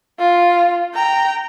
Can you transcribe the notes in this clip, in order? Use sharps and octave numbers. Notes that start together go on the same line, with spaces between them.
F4
G5 A#5